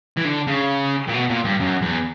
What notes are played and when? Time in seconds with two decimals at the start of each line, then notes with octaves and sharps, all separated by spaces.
0.17 E3
0.24 D3
0.47 C#3
1.08 A#2
1.14 B2
1.29 A#2
1.45 G2
1.60 F#2
1.82 E2